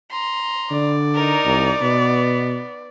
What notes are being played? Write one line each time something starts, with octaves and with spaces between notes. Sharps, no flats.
A#5 C6
D3 D5
D#4 A#4
C2
B2 B3